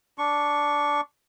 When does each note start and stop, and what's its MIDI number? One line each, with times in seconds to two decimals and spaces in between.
0.18 1.01 62
0.18 1.01 85